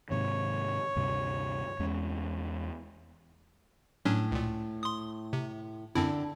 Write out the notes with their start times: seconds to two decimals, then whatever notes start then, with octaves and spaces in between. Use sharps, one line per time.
0.10 G#2 C3 D#3 C#5
0.96 D2 G2 C3
1.79 E2 G#3 C#4
4.05 A2 F#3 C#4 D4
4.32 C#2 A#2
4.83 C6 D#6
5.33 C3
5.95 F#2 D3 C4 E4